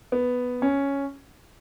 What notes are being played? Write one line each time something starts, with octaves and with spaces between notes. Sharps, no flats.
B3
C#4